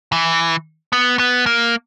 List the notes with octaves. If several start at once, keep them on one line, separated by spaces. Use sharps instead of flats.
E3
B3
B3
A#3